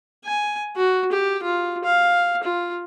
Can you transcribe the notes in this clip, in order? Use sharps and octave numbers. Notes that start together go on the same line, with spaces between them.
G#5
F#4
G4
F4
F5
F4